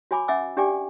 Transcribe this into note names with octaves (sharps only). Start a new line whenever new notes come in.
F#4 C#5 G#5 B5 D6
C#4 E5 F#5 G#5 D6 E6
D4 G4 D5 G5 G#5 D6